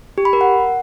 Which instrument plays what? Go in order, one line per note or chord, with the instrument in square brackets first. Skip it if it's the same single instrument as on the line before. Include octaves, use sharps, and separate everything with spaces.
[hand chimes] G4
B5
A#4
F#5